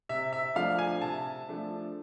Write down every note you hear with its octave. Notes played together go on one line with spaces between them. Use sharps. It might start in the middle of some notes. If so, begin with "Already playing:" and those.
C3 E5
E5
F3 A3 D4 F5
G#5
C3 A5
F3 A3 D4